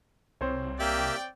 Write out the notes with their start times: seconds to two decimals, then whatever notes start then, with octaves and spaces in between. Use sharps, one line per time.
0.41 C2 C4 C5 C#5
0.80 A#3 G4 D5 E5 G5